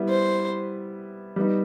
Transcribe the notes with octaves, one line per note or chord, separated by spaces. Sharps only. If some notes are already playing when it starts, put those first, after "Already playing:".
Already playing: G3 B3 E4
C5
G3 B3 D#4